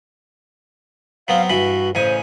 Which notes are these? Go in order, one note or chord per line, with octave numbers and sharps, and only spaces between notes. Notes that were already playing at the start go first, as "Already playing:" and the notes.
F#3 B3 C4 F5
G2 E3 F#4 B5
A1 C#3 C5 G#5